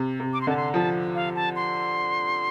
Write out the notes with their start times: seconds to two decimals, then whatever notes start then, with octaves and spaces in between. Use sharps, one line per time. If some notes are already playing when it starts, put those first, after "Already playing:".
Already playing: C3
0.20 C3
0.33 D6
0.41 C6
0.47 D3 A5
0.57 C6
0.74 F3 A5
1.15 F5
1.35 A5
1.56 C6